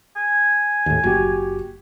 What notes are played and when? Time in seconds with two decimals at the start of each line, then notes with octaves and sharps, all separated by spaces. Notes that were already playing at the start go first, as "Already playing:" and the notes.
0.16 G#5
0.86 D#2 A2
1.03 F#1 F#4 G4